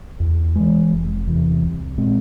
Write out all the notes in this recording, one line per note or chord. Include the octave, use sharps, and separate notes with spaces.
E2
E3 G#3
F1
E2 C3 E3
C2
A#2 G#3 C4